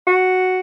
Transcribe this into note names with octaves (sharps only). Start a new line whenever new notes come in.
F#4